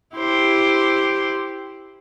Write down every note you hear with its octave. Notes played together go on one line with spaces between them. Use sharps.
E4 G4 C5